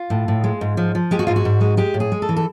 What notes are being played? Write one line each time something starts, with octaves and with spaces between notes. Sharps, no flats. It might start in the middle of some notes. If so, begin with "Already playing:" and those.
Already playing: F4
A2
A2
G#3
G#2
F3
F3
G#3 G4
F#4
G#2 F4
F#4
G#2
G#3
G#3 G4
A2
G#4
G#3
A4
E3
A4